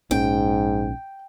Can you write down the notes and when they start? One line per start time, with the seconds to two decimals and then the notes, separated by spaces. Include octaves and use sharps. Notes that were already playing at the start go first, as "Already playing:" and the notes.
0.11 A#1 G#2 C#4 G5